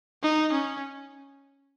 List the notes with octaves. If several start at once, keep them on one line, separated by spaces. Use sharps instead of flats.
D#4
C#4